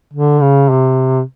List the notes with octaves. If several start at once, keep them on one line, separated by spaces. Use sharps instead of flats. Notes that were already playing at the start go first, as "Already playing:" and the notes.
D3
C#3
C3